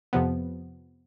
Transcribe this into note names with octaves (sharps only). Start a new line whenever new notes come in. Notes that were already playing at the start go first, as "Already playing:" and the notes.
F2 C3 F3 B3